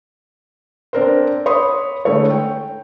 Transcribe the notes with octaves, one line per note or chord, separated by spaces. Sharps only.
C4 D4 A#4 C5
C#5 B5 C6 D#6
D3 G#3 A3 E4 A4 C#5
G5